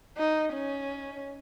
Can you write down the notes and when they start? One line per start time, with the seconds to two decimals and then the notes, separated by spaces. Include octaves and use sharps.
0.17 D#4
0.53 C#4